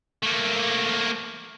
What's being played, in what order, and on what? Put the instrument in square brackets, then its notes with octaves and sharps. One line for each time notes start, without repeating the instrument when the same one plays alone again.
[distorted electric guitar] A3 A#3